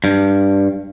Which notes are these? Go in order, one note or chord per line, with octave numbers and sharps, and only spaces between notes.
G2